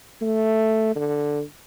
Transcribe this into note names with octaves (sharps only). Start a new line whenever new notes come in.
A3
D3